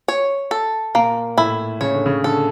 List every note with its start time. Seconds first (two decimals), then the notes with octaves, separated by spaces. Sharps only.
0.08 C#5
0.51 A4
0.95 A#2 A#3
1.38 A2 E4
1.81 C#3 C#5
1.94 D3
2.06 C#3
2.24 D3 A4